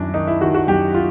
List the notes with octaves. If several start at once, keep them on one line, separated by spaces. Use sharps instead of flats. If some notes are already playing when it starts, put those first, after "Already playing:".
Already playing: F#2 D#3 D4 E4
D#3 D#4
E4
D#3 F#4
F#4
F#2 G4
F4